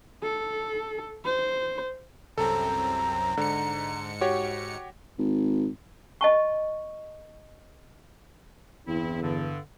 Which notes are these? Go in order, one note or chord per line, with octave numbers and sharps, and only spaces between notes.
A4
C5
C2 F#2 C4 A4 A#5
G#2 D3 C#7
F#4 G4 C#5
G#1
D#5 A5 C#6
E2 G2 C4 E4
G2 D3